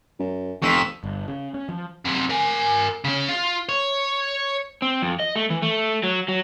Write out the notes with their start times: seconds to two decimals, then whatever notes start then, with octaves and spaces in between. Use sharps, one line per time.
0.19 F#2
0.62 F1 F2 C#6 E6 B6
1.04 G1
1.28 C#3
1.54 C#4
1.69 F3
2.05 F#2 C3
2.30 A#4 G#5
3.04 C#3 C#4
3.29 F4
3.69 C#5
4.82 C4
5.02 F2
5.20 D#5
5.36 A3
5.50 E3
5.62 A3
6.03 F#3
6.28 F#3